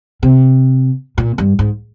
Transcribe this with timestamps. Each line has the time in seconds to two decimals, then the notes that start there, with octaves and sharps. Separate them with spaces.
0.23 C3
1.18 A#2
1.38 G2
1.59 G#2